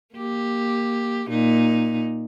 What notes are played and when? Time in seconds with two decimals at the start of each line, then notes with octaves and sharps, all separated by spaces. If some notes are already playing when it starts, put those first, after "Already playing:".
0.14 A#3 G4
1.29 A#2 D#4